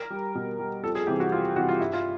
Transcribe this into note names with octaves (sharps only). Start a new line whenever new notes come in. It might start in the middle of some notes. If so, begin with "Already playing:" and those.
Already playing: A#4
G3
B2
G3
F2 A4
G#4
C3 E3 G3 G4
F#4
F2 F4
C3 E3 G3 F#4
F4
G2 E4
F4